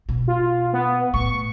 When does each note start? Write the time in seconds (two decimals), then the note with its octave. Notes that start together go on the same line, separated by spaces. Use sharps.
0.09 B2
0.28 F4
0.73 B3
1.14 A2 C#6